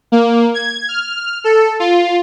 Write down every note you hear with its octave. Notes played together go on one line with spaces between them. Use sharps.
A#3
G#6
F6
A4
F4